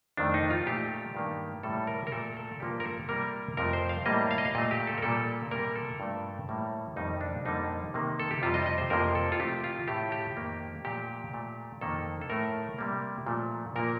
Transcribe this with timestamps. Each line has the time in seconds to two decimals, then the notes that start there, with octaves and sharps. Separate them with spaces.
0.17 F2 D#3 A3 D4
0.34 D#4
0.50 F4
0.66 A#2 A3 G4
1.15 G2 D#3 A#3
1.63 A2 G3 A#3 A4
1.87 A#4
2.07 A#4
2.12 A#2 A3 A4
2.37 A4
2.60 G2 F3 A#3 G4
2.80 A#4
2.84 A4
3.09 C3 G3 A#3 A#4
3.57 F2 C3 F3 A3 A#4
3.73 C5
3.89 F5
4.06 A2 G3 A#3 D#5
4.31 F5
4.38 D#5
4.45 F5
4.55 A#2 A3 D#5
4.71 G4
4.87 A4
4.98 A#4
5.02 A#2 G3 A#3 A4
5.51 C3 G3 A#3 A#4
5.75 A4
6.00 G2 F3 A3
6.49 A2 G3 A#3
6.96 F2 D#3 G3 A#3 D#4
7.21 D4
7.45 F2 D3 G3 A#3 D#4
7.94 C3 D#3 A#3
8.20 A4
8.31 G4
8.42 F2 C3 G3 F4
8.54 D#5
8.66 D#5
8.78 C5
8.90 F2 C3 F3 A#3 A#4
9.15 A4
9.32 F4
9.40 C3 F3 A3 G4
9.64 F4
9.88 A2 A3 G4
10.12 G4
10.36 F2 D#3 A#3
10.85 A#2 F3 A3 G4
11.33 A#2 A3
11.81 F2 D#3 A#3 A4
12.21 A4
12.30 A2 A3 A#4
12.78 C3 G3 A#3
13.26 A#2 F3 A3
13.76 A#2 F3 A#3 A#4